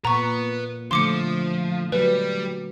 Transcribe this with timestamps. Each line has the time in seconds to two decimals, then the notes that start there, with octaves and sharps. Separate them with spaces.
0.05 A#2 B4 F#5 A#5 C#6
0.91 D3 F3 A3 C6 D6 C#7
1.92 F#3 G3 B4